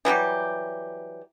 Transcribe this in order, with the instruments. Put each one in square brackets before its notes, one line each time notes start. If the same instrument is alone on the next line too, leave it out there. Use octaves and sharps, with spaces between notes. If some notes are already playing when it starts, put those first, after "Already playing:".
[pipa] E3 F#3 G3 G4